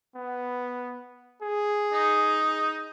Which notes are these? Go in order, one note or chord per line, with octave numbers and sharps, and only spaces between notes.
B3
G#4
D#4